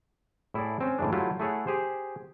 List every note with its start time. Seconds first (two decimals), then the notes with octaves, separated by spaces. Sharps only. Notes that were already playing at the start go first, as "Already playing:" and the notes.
0.54 A2 E4 G#4 A4 D5
0.81 C4 C#4
0.98 A2 C#3 E3 G#3 D4
1.12 F#3 A3 E4 F4 G4
1.39 A3 E4 G#4 A4 C#5 F#5
1.67 G4 G#4 C5